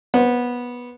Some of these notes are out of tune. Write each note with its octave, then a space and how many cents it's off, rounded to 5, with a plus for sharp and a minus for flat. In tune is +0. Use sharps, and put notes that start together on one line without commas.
B3 -15 C5 +10